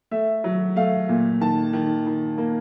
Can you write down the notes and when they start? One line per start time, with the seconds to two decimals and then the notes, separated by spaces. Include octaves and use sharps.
0.11 A3 E5
0.44 F#3
0.76 A3 F5
1.09 A#2
1.41 D#3 A5
1.73 D#3
2.06 D#3
2.38 A#3